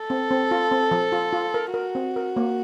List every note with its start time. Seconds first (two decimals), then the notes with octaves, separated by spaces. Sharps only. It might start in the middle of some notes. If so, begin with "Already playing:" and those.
Already playing: A4
0.10 C4
0.31 C4
0.51 F4
0.71 C4
0.91 F3
1.12 F4
1.33 F4
1.54 A#4
1.74 F#4 A#4
1.95 C4
2.16 A#4
2.36 A#3